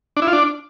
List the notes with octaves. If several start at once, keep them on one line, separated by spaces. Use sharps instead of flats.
D4
E4
F4
D4